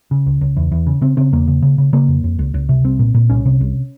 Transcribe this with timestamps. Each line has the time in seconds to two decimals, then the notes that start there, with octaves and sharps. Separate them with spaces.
0.11 C#3
0.26 C#2
0.41 C#2
0.57 E2
0.72 E2
0.87 C#3
1.01 C#3 C4
1.17 C#3 C4
1.32 E2 A#3
1.48 C#3
1.62 C#3
1.78 C#3
1.93 C#3 A#3
2.08 F2
2.24 F2
2.39 C#2
2.54 C#2
2.69 C3
2.84 C2 C4
2.99 A#2
3.14 A#2
3.30 C2 C#4
3.45 C3
3.60 C2